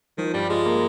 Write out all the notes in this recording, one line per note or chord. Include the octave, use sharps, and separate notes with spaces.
D#3 F3
G2 G3
G#3 F4
A#3